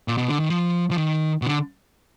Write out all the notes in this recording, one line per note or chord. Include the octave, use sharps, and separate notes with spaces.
A#2
B2
D3
D#3
F3
F3
D#3
B2
D3